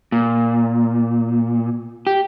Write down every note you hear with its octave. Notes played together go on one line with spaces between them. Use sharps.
A#2
G4